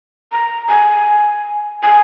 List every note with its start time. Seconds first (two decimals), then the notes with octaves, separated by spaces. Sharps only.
0.32 A#5
0.69 G#5
1.83 G#5